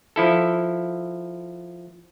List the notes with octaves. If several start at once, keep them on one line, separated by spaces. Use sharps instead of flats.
F3 E4 A4